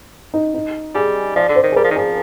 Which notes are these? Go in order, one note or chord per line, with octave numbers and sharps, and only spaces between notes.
D#4
D#4
G3 G#4
F3 D5
D3
C5
D#3
G#4
G3 A#4
F3
D#3
F3 G#4